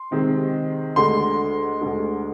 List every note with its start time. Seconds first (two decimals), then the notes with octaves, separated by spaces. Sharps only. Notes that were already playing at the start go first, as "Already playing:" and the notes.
Already playing: C6
0.11 C3 D#3 G#3 C4
0.96 D2 D3 G#3 C6
1.81 D2 D3 G#3